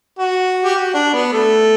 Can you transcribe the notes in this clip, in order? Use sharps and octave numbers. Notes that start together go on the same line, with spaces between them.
F#4
G4
F#4
D4
B3
A3